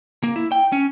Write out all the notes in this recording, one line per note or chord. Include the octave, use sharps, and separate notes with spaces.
A#3
E4
G5
C#4